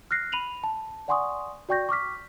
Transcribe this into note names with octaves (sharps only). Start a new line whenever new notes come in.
F6 F#6 A#6 C7
B5 D#7 F7 F#7
A5
D5 F#5 G#5 C6 C#6 D#6
F#4 D5 G5 C#6 G6 A#6
C#6 D6 F6 B6